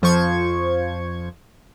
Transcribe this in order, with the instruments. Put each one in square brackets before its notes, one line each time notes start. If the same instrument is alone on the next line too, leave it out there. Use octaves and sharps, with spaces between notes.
[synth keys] F2 F3 C5 C#6 G#6